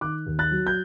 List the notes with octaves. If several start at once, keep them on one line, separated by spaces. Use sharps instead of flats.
D#3 D6 F#6
D#2
F#6 A6
F#3
G6